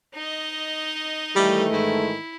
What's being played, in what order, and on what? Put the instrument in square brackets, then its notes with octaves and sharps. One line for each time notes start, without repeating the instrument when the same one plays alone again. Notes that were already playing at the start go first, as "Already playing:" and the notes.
[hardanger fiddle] D#4 D#5
[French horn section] D#3 E3 A3 [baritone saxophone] G3
[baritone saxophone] G#2 [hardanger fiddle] E4